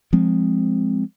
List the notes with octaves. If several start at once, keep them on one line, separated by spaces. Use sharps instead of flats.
F3 G#3 C4